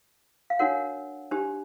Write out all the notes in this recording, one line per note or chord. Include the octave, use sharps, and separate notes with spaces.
F5
D4 F#4 A#4 C#5 F#5
D4 G4 C5